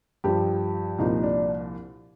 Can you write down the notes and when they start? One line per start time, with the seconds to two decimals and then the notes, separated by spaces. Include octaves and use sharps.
0.24 G2 F3 G4
0.98 C2 A#2 F3 D#4
1.23 D4